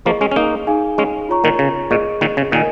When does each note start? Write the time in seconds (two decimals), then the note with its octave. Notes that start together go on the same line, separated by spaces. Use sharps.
0.05 F3 A#3 G#4 D#5 C#6
0.21 G#3 C#4
0.31 C#4
0.36 A#3 D#4
0.67 D#4 G#4 F5 G#5
0.98 G#3 C#4
1.29 F4 C#5 A#5 C#6
1.44 A#2 D#3
1.59 C#3
1.91 A#2 G#4 D#5 C#6
2.21 A#2 D#3
2.37 C#3
2.51 A#2 D#3 A#4 D#5 G#5